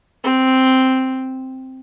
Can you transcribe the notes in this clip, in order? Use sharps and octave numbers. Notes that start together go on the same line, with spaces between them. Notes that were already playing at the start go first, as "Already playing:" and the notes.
C4